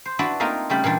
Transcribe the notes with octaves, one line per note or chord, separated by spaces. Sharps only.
C5
D4 E4 F#4 B4 D5
A3 A#3 C4 D4 D#4 F4
C#3 G3 A3 G4 G5 B5
A#2 E3 G3 D4